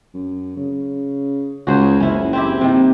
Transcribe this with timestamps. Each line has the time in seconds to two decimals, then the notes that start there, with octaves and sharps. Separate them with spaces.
0.14 F#2
0.57 C#3
1.67 C#2 F#4 G#4 C5
2.00 F#1 C#4 E4
2.33 C4 E4 G4
2.61 C3 D#3